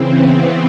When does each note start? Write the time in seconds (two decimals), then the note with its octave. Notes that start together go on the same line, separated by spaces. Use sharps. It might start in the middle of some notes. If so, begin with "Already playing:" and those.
Already playing: C#3 E3 C4
0.12 B3